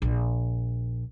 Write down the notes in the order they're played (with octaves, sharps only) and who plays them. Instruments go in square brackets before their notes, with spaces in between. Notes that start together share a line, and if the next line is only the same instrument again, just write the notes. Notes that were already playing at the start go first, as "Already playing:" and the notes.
[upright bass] A#1